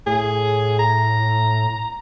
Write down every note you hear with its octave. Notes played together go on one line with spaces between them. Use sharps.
A2 G#4
A#5